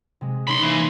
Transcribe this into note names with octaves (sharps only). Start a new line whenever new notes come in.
C3 G#3
C#4 D#4 C#5 B5 C6
E3 A#3 A#6